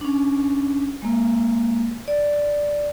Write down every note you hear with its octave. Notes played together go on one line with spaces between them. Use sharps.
C#4 D4
G#3 A#3
D5